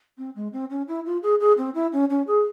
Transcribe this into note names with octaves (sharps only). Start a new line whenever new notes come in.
C4
G#3
C4
C#4
E4
F4
G#4
G#4
C4
E4
C#4
C#4
G#4